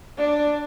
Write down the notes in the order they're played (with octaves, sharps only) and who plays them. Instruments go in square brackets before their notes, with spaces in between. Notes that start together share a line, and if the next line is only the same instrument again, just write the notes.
[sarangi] D4